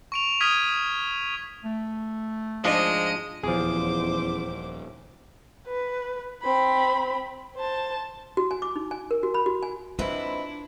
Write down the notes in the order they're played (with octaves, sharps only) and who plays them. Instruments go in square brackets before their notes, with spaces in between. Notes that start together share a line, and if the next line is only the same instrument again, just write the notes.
[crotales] C#6 D7 F7
D#6 F6 G#6 B6 D#7
[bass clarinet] A3
[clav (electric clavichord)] G#2 F3 D4 [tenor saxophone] G#3 [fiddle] D#5
[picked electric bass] D#1 [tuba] E2 [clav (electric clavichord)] F3 G#4 [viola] C5 D6
[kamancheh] B4
C4 B5
C5 A5
[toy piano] F#4
G#5
D6
D#4
G#5
A#4
F#4
B5
F#4
G#5
[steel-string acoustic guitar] G#2 C4 E5 [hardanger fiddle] D4 E4 [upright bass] F4 [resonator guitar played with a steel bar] B4